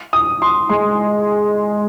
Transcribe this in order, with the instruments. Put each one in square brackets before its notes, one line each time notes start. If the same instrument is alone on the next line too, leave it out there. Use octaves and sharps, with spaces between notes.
[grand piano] D#6
C6
[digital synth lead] G#3 [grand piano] C6